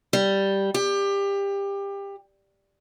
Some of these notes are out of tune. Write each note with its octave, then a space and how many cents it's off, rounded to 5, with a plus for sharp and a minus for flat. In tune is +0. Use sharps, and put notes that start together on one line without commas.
G3 +0
G4 +25